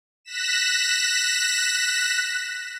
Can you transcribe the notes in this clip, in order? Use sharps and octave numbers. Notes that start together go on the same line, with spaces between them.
F#6 A#6 B6 E7